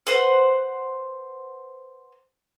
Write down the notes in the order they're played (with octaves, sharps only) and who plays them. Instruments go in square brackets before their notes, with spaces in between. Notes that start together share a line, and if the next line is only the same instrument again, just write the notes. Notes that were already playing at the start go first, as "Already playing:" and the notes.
[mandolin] B4 C5 F#5